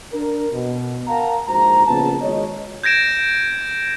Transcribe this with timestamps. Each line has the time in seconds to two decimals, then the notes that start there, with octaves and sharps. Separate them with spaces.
0.14 D4 A#4
0.53 B2
1.07 A#4 F5 F#5 A5 A#5
1.47 A#1 G#2 F#4 C5 A#5
1.87 A#1 A#2 C#3 B3 A5
2.22 G#1 C#5 D#5
2.83 G6 G#6 A#6 D7 E7